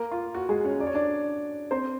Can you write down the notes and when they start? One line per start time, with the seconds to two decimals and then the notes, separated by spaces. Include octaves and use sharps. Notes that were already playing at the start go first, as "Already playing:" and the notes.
Already playing: A#3 A#4
0.12 F4
0.35 F#4
0.49 G#3 G#4
0.65 C#4 C#5
0.80 D5
0.87 C#5
0.94 D4 D5
1.71 C4 C5